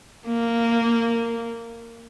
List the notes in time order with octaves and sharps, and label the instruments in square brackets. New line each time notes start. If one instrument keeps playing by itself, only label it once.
[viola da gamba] A#3